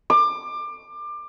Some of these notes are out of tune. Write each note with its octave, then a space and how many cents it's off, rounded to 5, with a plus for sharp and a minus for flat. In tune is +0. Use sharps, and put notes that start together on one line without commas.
D6 +25